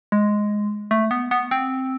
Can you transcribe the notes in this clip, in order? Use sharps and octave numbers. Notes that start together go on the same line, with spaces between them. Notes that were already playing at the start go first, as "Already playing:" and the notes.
G#3
A3
B3
B3
C4